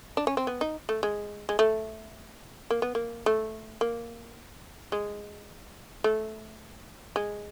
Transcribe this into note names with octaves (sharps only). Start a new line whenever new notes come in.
D4
C#4
C4
B3
D#4
A3
G#3
G#3
A3
A#3
B3
A#3
A3
A#3
G#3
A3
G#3